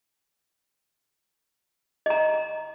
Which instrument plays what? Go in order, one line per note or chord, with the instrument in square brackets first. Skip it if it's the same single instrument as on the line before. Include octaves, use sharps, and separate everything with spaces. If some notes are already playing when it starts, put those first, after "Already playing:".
[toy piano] D#5 A#5